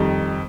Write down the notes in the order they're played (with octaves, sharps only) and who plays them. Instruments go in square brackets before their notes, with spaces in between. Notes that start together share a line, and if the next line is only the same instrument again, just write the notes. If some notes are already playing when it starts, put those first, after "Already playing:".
Already playing: [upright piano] F2 D#3 G3